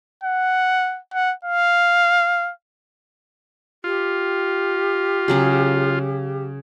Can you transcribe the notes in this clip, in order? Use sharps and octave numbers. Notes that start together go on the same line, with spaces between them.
F#5
F#5
F5
F4 G4
C#3 F#3 G#4